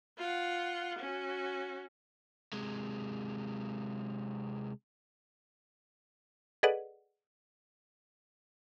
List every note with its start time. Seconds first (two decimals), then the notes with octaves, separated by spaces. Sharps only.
0.18 F4 F#5
0.99 C#4 F#4
2.53 C3 G#3
6.63 G#4 A4 B4 D5 D#5 F#5